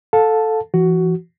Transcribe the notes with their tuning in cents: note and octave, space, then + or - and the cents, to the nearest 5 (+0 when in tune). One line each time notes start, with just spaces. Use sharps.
A4 +0 F5 +30 A5 +0
E3 +40 F#4 +10